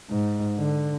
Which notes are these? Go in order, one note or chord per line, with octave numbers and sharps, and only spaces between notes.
G#2
D3